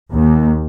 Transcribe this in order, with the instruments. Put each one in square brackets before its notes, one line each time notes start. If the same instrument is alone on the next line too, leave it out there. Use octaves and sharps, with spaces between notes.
[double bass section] D#2